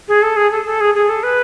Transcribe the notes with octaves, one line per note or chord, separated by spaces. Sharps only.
G#4
A4
G#4
A4
A4
G#4
G#4
A4
B4